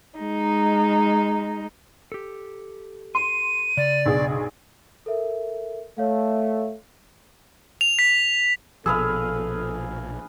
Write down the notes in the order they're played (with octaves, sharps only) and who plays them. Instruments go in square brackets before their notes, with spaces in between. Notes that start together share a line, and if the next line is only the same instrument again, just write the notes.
[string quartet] G#3 D#4
[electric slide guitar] G4 A4
[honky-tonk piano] C6 [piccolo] D#7
[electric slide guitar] C#3 [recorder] D5
[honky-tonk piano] B1 G2 G#4
[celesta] A4 A#4 E5
[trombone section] A3 [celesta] C#5 F5
[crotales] F7
B6
[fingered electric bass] A#1 B2 F3 [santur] G#4 B4 F5 [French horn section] A4 [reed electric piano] E6